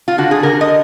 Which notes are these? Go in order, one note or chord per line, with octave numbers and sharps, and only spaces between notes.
F4
D3 F#4
G#4
D3 A#4
D#5